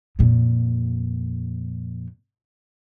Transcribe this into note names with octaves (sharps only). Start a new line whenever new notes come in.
F2 A#2